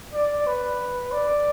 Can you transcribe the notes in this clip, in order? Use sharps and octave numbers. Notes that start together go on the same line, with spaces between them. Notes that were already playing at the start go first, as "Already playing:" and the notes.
D5
B4
D5